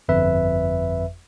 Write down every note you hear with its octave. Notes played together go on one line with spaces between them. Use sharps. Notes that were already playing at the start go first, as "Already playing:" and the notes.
G1 F2 B4 E5